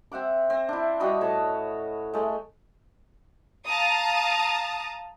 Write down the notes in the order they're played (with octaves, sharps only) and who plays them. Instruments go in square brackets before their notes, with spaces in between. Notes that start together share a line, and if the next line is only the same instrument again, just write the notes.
[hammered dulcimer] C4 E5 F#5 D6
C4
D4 E4
G3 F#4 D#5 B5
A2 C#5 A5
G#3 A3
[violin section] F5 A5 A#5 D#6